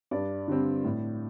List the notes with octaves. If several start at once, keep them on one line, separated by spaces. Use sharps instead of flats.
G2 D5
D3 G3 C4
A2